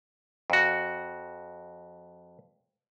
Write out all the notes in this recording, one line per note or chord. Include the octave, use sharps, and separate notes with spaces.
F2 F#4